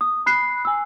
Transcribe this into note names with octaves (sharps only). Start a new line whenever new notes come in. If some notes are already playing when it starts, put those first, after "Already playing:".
D#6
B5 F#6 C7
G#5 E6